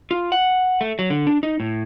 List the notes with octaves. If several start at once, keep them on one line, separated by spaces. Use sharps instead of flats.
F4
F#5
A3
F#3
D3
D4
D#4
A2